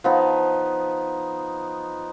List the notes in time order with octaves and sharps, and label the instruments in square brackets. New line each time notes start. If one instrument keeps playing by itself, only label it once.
[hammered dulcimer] F3 B3 D#4